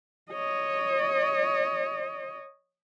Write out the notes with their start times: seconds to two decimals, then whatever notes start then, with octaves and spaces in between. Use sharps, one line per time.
0.32 C#5 D#5